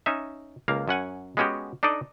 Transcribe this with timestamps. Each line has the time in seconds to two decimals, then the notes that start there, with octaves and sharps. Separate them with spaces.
0.06 C#4 D#4 E5
0.68 C#2 A#3 F5
0.88 F#2 C#4 F#5 G#5
1.37 G#3 B3 C#4 F#4 G4
1.83 D4 D#4 A4 D5 D#5